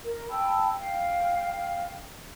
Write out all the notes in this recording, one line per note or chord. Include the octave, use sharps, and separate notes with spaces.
A#4
G5 A5 B5 E6
F5 G5